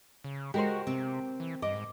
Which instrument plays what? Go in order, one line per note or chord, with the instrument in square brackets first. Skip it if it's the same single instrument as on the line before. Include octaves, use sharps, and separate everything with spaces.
[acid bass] C#3
[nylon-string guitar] G#3 [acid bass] F#4 [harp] G4 A#4 C5
[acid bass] C3 [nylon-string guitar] C4
[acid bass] E3
[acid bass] G2 [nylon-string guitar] D#5 [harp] D6
[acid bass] G#2